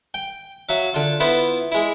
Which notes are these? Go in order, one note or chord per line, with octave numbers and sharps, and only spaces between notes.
G5
F#3 E5 F5
D3 F4
B3 E4 F4 C5
G#3 E4